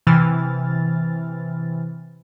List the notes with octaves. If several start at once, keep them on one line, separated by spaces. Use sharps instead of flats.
C3 E3 F6 A6